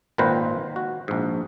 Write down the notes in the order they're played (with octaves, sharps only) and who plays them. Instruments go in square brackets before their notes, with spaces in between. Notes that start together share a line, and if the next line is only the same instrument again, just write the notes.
[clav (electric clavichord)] G#1 A#2 D#3 B4 C5 A#5
F#4
A#1 G#2